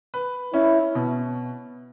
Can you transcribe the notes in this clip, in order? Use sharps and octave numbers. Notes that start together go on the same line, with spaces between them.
B4
C#4 E4
B2